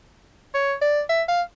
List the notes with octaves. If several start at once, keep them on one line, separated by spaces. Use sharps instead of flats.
C#5
D5
E5
F5